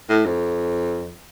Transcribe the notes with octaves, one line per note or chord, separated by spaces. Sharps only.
A2
F2